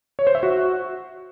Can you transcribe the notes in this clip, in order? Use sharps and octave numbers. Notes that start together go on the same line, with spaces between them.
C#5
C5
E5
F#4